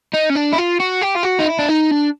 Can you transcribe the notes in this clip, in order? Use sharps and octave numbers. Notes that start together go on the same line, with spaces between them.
D#4
C#4
D4
E4
F4
F#4
G4
F4
F#4
D#4
E4
D4
D#4
D4